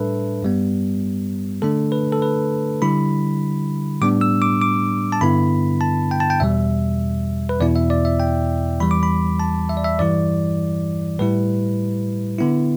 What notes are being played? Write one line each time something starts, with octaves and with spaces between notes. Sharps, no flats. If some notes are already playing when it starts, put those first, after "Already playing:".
Already playing: A2 G3 D4 A4 B4 E5
G2 G3 B3
D3 A3 D4 A4
B4
A4
B4
D3 G3 E4 B5
A2 G3 B3 D4 D6
E6
D6
D6
A5
G2 D3 B3 E4 B5
A5
G5
A5
G5
E2 B2 G3 E5
B4
E2 B2 B3 E4 D5
E5
D5
E5
G5
E2 E3 G3 B5
D6
B5
A5
E5
D5
E5
G2 E3 G3 E4 D5
A2 G3 E4 B4
D3 B3 E4